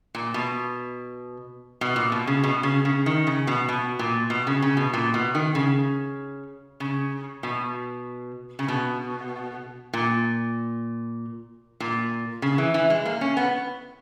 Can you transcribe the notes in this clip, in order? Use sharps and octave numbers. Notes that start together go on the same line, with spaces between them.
A#2
B2
B2
A#2
B2
C#3
B2
C#3
C#3
D#3
C#3
B2
B2
A#2
B2
C#3
C#3
B2
A#2
B2
D#3
C#3
C#3
B2
C#3
B2
A#2
A#2
C#3
E3
E3
G#3
A#3
C#4
B3